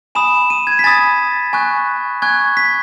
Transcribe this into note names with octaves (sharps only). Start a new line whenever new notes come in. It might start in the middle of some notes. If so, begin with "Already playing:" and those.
G#5 B5 D#6 E7
D#7
G#6
B6
G#5 B5 D#6 A6
G#5 C#6 F#6
G#5 C#6 F#6 G#6
B6